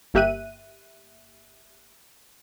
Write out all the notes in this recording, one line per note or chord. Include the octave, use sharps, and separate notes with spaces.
G1 A#3 G4 E5 F#6 D#7